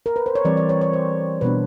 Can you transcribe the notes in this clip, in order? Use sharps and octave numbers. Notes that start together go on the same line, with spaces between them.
A#4
B4
C5
C#5
E3 G3 C4 D5
D5
C#5
C#5
C5
B2 G3 B3 D4 B4